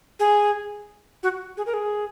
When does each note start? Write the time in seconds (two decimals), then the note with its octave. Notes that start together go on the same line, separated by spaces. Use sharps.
0.20 G#4
1.23 F#4
1.57 G#4
1.66 A#4
1.74 G#4